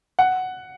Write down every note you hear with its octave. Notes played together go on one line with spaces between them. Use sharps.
F#5